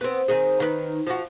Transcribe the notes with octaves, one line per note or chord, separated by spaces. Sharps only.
B3 C4
D#3 C4 G#4
D#3 B4
F3 F#4